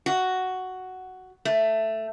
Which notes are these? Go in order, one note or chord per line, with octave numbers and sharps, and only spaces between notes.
F#4
A3